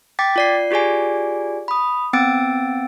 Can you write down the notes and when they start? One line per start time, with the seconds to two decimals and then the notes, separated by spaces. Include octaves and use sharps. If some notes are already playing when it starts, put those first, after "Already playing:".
0.19 G5 D6 A6 B6
0.36 F4 D5 C7
0.71 F4 G4 G#4 D5 G#5
1.68 B5 D#6
2.13 B3 C4 G5 E6 A6 D7